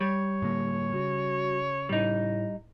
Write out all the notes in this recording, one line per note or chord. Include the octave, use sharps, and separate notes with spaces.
G3 C#5
A2 D3 A#3
C#3 F#4
A2 G3 D#4